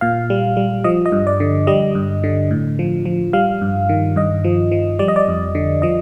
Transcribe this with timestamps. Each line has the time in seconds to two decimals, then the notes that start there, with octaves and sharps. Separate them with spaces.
0.01 A#2 F5
0.30 G3
0.57 G3
0.84 F3 D#5
1.06 D#5
1.12 G2
1.27 D5
1.40 D3
1.67 G3 D#5
1.95 G2
2.24 D3
2.51 A2
2.79 F3
3.05 F3
3.33 G3 F5
3.61 G2
3.89 D#3
4.16 G2 D#5
4.44 F3
4.72 F3
4.99 G3 D5
5.08 D#5
5.16 D5
5.28 F2
5.55 D3
5.82 F3 D#5